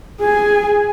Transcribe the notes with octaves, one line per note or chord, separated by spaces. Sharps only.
G#4 G#5